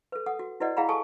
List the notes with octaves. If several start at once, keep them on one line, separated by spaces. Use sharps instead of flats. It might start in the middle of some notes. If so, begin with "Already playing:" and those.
A4 B4
A4 F#5 D#6
F#4
E4 F#4 B4 D5 D#5 F#5
E4 G#4 F5 F#5 A#5 B5
G#4 A4 G#5 A5 C#6 D#6